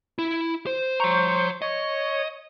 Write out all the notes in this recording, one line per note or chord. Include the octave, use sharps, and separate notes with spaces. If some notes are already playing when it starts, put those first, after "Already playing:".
E4
C5
C5 C#5 A#5 C#6 G6
C#5 D#5